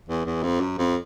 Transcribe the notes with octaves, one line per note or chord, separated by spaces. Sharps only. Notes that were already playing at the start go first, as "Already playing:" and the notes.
E2
E2
F2
F#2
F2